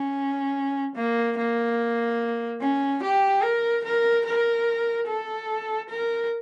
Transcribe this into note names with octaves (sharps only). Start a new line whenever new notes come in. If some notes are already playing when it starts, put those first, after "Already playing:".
Already playing: C#4
A#3
A#3
C#4
G4
A#4
A#4
A#4
A4
A#4